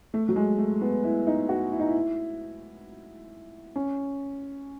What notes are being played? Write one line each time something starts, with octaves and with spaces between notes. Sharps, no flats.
A3
F#3
G#3
A3
B3
E4
D#4
F#4
E4
D#4
E4
C#4